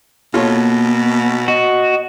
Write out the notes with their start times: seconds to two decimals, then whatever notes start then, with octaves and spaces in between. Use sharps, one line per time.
0.34 B2 A#3 F4 A4 C#5
1.48 F#4 D#5